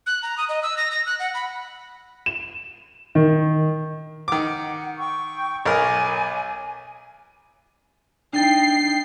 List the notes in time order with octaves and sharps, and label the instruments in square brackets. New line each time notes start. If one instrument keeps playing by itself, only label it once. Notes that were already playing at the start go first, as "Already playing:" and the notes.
[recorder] F#6
A#5
D#6
D#5
E6
A#6
A#6
F#6
F#5
B5
[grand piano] E7
D#3
[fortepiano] D#3 D6 [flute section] F#5
[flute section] G5 C#6 E6
[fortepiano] B1 A#4 [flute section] C#5 G#5 D6
[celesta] D4 A6 [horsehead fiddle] D#4 G5 [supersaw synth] C7